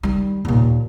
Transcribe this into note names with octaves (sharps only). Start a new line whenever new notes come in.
D#3 G3
D#2 A#2